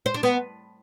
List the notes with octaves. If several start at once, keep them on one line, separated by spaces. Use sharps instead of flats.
C5
D4
B3